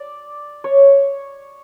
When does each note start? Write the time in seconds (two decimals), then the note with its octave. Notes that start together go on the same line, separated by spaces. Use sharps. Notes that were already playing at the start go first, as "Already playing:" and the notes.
Already playing: D5
0.64 C#5